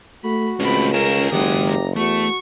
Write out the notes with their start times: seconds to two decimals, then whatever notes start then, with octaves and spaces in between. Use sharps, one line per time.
0.24 A3 F#4 B5
0.60 C#2 A3 C4 C#4 B5
0.94 C#4 F4 G#4 A#4 E7
1.32 F#1 D#3 G#3 G4 F#5 D#6
1.65 A#5
1.96 E2 A3 F#4 C#6